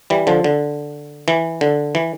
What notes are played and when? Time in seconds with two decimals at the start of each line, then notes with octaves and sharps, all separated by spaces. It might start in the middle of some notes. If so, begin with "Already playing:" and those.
0.10 E3 G3
0.27 D3 F3
0.44 D3
1.28 E3
1.61 D3
1.95 E3